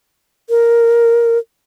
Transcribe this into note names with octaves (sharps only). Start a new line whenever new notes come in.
A#4